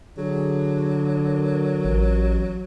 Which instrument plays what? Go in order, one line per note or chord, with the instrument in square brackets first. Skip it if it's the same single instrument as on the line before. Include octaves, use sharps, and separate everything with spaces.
[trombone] D3 [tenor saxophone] F#3 [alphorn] G#4
[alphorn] A#4
[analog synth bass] A1